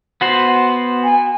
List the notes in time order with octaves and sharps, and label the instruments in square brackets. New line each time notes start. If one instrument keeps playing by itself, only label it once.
[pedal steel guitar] B3 F#4 C5
[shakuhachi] G#5